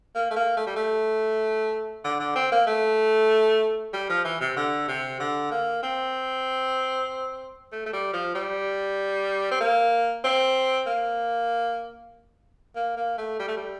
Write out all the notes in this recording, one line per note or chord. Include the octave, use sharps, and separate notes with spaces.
A#3
A3
A#3
A3
G3
A3
D3
D3
C4
A#3
A3
G3
F3
E3
C3
D3
C3
D3
A#3
C4
A3
A3
G3
F3
G3
C4
A#3
C4
A#3
A#3
A#3
A3
G3
A3
G3